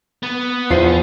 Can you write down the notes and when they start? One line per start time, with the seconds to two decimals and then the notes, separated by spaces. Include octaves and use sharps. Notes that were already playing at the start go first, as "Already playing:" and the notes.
0.23 B3
0.70 E2 F3 C7